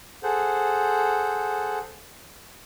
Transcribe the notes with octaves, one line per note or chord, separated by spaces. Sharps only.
G#4 A4 C5 F#5